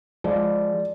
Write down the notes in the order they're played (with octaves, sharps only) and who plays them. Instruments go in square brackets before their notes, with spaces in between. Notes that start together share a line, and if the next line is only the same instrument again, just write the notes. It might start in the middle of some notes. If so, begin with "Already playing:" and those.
[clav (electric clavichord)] F3 G#3 [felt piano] D5